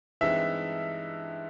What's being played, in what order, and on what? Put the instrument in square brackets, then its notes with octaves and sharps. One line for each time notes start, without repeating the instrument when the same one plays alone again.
[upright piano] G2 E3 G#3 C4 D#4 [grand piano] E5